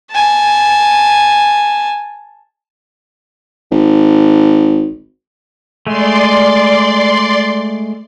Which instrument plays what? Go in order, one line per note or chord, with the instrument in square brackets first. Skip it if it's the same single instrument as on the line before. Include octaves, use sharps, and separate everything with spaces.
[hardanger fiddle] G#5 A5
[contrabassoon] G#1
[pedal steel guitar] G#3 A3 [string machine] D5 C6